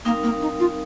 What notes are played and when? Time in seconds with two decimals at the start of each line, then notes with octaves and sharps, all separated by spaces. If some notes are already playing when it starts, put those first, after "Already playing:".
0.05 G3 A#3 C4 D#4 A#4 F5
0.23 A#3
0.41 D#4
0.60 F4